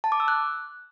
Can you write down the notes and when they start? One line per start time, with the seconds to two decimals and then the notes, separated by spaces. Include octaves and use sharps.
0.04 A5
0.12 D6
0.20 E6
0.28 F#6